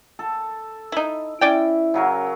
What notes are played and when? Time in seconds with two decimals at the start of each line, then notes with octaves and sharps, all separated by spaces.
0.19 A4
0.92 D#4 E4
1.41 C#4 E4 D5 G5
1.94 C#3 F#3 A#4